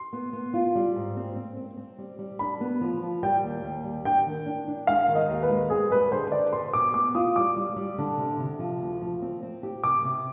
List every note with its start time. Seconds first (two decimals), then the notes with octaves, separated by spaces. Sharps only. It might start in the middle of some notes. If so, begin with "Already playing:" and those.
Already playing: C6
0.13 B3
0.33 B3
0.54 F4
0.75 G3
0.95 G#2
1.17 C4
1.36 C4
1.57 C4
1.77 C4
1.98 G3
2.19 G3
2.39 D4 B5
2.61 B3
2.81 F3
3.02 F3
3.23 G3 G5
3.43 D#2
3.64 D#2
3.84 G3
4.05 D4 G5
4.26 D#3
4.46 D4
4.68 D4
4.87 G#3 F5
5.08 D#3
5.15 D#5
5.29 D#2
5.42 B4
5.50 G#3
5.70 C4 G#4
5.90 G3 B4
6.12 D3 C5
6.32 D3 D5
6.53 B4 C6
6.73 B2 D6
6.94 B3 D6
7.15 F4 D#6
7.36 G3 D6
7.56 G3
7.76 G3
7.98 D3
8.18 C3
8.40 C3
8.59 F3
8.80 D2
9.01 F3
9.22 C4
9.43 C4
9.63 G4
9.83 C3 D6
10.04 C3